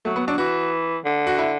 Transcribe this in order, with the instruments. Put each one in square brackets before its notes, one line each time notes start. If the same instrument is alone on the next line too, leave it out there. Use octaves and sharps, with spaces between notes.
[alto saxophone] F#3 [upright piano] A3
[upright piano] B3
[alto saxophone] F#3 [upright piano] D4
[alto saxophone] E3 [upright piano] F#4
[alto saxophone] D3
[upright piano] F#4
E4